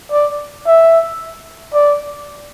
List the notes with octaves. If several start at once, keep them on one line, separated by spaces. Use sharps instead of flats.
D5
E5
D5